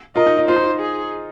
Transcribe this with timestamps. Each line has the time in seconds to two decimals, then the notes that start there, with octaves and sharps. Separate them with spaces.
0.16 F4 A#4 D#5
0.26 D#4
0.37 D#4
0.48 F4 C5
0.56 D#4
0.64 F4
0.81 G#4